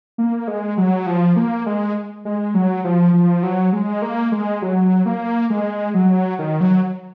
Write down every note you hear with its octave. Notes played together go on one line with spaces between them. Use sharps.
A#3
G#3
F#3
F3
A#3
G#3
G#3
F#3
F3
F3
F#3
G#3
A#3
G#3
F#3
A#3
G#3
F#3
D#3
F#3